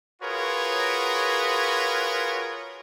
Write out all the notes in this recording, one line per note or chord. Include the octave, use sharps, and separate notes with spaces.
F4 F#4 G#4 A#4 B4 C#5